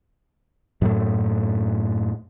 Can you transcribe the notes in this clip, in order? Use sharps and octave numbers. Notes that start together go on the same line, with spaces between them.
F#2 A2 A3